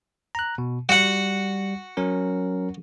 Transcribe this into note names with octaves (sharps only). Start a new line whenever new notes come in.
A#5 F#6
B2
G3 F#4 F#5
F#3 C#4 A#4